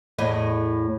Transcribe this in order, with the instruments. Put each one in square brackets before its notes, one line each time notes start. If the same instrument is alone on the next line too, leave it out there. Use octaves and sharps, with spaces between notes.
[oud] E2 A2 D#5